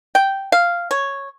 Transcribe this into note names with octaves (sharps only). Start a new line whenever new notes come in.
G5
F5
C#5